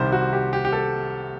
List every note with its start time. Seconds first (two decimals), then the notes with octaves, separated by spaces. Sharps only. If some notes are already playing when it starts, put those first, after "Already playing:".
Already playing: C2 C3 D#3 G3 C5
0.12 F#4
0.33 G4
0.53 G4
0.65 G4
0.73 A4